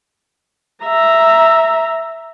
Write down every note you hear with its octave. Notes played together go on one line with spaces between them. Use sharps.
E5 A#5